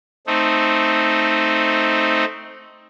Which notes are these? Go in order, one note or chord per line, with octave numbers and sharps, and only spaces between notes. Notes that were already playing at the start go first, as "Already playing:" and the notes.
A3 C4 D#4